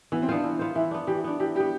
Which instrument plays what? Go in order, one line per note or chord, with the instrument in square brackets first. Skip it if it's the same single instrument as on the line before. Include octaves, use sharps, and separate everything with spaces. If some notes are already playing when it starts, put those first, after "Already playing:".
[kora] E3 [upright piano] B3
[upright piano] C4
[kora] B3 F4 C5 [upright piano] D4
[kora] E3
B3 F4 C5
[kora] E3 [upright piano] E4
[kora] B3 D4
[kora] E3 [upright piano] G4
[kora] B3 D4
[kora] E3 [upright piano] G4
[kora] G3 B3 [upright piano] G4